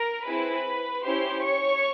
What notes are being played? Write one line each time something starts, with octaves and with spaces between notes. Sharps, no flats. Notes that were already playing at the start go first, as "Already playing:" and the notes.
Already playing: A#4 A#5
C4 E4 G#4 B4 B5
C#4 E4 G4 C5 C6
C#5 C#6